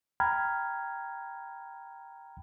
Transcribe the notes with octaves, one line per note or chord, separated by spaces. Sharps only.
G5 A#5 B5 F6 G#6